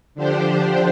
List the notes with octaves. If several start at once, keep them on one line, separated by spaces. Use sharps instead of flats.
D3 F3 D4 G4 C5